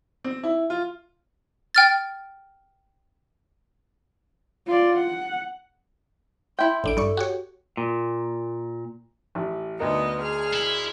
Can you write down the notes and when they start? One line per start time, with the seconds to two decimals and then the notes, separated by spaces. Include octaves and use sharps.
0.24 C4
0.43 E4
0.70 F4
1.75 G5 F6 A6
4.67 F4 D5
4.97 F#5
6.59 E4 G5 C6
6.84 A1 D4 A4 D7
6.97 G2 D5 C#6
7.17 F#4 G4 C#5
7.77 A#2
9.35 A1
9.80 D2 B3 D#4 A#4 D#5
10.21 G#4 F6
10.54 E4